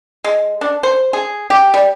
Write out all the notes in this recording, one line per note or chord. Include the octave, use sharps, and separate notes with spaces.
G#3
D4
C5
G#4
G4
G3